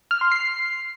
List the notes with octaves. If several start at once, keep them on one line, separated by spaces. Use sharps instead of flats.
F6
C6
C7